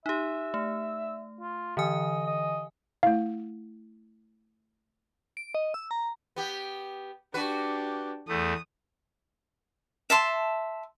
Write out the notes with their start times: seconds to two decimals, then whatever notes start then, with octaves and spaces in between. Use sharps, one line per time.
0.06 D#4 G4 E5
0.54 A3
1.41 F4
1.77 D3 E3 D#5 G#5
2.27 D#5
3.03 A3 E4 F5
5.37 D7
5.55 D#5
5.74 E6
5.91 A#5
6.36 B3 G4
7.34 D4 F#4 G4 B4
8.28 E2 A3 D#6
10.10 E5 A5 C6